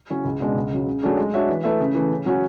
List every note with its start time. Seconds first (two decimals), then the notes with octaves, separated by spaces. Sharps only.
0.10 C#3 F#3 C#4 E4
0.25 C#2
0.40 B2 G#3 D4
0.55 C#2
0.71 C#3 F#3
0.87 C#3
1.03 F#3 A3 D4 G#4
1.17 G#3
1.34 D4 F#4 C#5 E5
1.49 E3
1.64 A3 E4 B4 E5
1.80 C#3
1.95 E3 A3
2.11 C#3
2.26 F#3 C#4 F#4